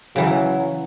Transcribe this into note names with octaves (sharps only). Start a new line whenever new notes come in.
C#3 E3 F#3